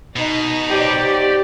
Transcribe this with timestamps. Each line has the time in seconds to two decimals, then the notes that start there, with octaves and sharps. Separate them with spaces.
0.16 B2 D#4
0.69 F#3 G4 C5 D5